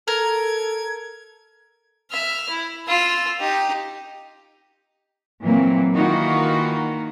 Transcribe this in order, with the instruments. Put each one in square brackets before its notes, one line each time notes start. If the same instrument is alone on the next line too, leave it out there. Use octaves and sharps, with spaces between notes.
[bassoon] A4 [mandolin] A#4 [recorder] G#6
[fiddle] E5 F6
E4
F4 E6
D#4 G4
[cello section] A#2 E3 F#3 A#3 C4
D#3 E3 A#3 D#4 F4 F#4